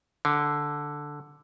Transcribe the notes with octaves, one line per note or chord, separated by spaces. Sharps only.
D3